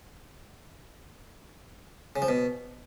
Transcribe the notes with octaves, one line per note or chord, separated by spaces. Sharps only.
C#3
F3
B2